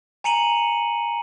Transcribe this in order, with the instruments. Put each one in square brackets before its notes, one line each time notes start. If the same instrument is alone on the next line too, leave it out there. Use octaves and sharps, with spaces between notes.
[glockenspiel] G#5 A#5 C#7 D#7 F#7